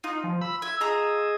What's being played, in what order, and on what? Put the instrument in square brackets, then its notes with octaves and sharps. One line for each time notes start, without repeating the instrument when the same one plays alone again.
[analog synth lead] D#4 [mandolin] F4
[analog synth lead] F3
[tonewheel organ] B5 [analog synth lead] E6
[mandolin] E5 [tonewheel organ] G#6
[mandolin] F4 A#5 D#6 [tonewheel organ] G#4 D#5